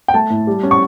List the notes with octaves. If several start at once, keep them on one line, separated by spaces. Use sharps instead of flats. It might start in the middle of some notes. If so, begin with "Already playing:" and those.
G5
A3 A5
A2
G3
C#4
C#6